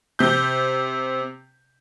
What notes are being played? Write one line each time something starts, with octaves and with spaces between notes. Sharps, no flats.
C3 G6